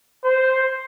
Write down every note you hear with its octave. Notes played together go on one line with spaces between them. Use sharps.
C5